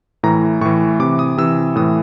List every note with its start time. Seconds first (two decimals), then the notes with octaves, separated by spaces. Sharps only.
0.23 A2 E3 A#5
0.61 A2 E3 C#6
0.99 C3 E3 D6
1.19 D#6
1.38 C3 E3 E6
1.76 A2 E3 D#6